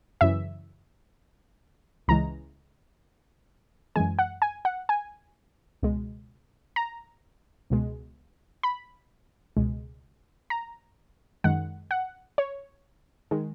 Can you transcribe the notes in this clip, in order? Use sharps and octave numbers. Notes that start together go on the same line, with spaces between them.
F#2 C#3 E3 E5
C#2 C#3 E3 G#3 A#5
F#2 E3 G#3 G#5
F#5
G#5
F#5
G#5
C#2 B2 G#3
A#5
C#2 B2 G#3
B5
C#2 B2 G#3
A#5
F#2 D#3 G#3 F#5
F#5
C#5
D#3 G#3